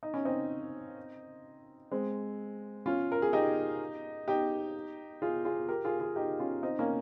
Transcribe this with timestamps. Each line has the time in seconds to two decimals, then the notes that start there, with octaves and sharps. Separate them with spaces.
0.03 D#4
0.14 C#4
0.25 C4 D#4
1.91 G#3 C4
2.86 C#4 F4
3.12 A#4
3.22 G#4
3.33 D#4 G4
4.28 D#4 G4
5.22 F4 G#4
5.45 F4 G#4
5.69 G4 A#4
5.85 F4 G#4
6.00 F4 G#4
6.16 D#4 G4
6.39 C#4 F4
6.63 C4 D#4
6.79 A#3 C#4